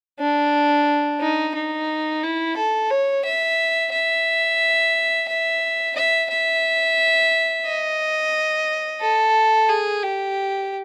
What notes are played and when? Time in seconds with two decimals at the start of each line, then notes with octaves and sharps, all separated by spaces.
0.19 D4
1.21 D#4
1.55 D#4
2.23 E4
2.57 A4
2.91 C#5
3.25 E5
3.92 E5
5.28 E5
5.96 E5
6.30 E5
7.66 D#5
9.01 A4
9.69 G#4
10.03 G4